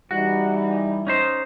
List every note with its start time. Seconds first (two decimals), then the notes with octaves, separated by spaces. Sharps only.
0.11 E3 G3 D#4 F#4
1.07 C#4 D#4 C5